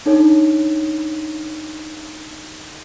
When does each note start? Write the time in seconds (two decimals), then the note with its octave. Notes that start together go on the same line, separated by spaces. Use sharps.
0.06 D4 D#4 A4 C#5